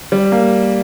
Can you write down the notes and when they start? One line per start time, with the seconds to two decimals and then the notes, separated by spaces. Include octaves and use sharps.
0.12 G3
0.32 A#3